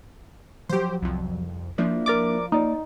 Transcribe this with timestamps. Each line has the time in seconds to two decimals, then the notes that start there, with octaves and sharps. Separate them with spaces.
0.69 F3 F#3 G4 C5
1.02 C2 F2
1.78 F3 A#3 D4 E4
2.06 A#4 D5 D6
2.52 A#3 D#4 D5